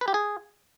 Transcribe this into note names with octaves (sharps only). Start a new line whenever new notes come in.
B4
G4
G#4